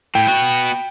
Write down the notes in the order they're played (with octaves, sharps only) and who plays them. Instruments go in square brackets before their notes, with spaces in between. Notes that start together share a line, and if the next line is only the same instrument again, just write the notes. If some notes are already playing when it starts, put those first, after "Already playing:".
[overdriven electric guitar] A2 [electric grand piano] G5
[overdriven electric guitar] B3 F#4